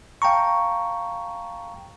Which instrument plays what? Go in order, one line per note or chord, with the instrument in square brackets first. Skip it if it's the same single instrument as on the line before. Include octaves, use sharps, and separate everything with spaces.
[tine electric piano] F5 G5 A5 A#5 C#6